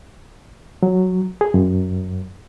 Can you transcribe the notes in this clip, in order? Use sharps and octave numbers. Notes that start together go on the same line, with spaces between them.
F#3
G#4
F#2